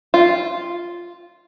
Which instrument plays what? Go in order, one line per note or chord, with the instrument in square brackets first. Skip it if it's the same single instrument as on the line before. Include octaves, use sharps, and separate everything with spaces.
[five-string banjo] F4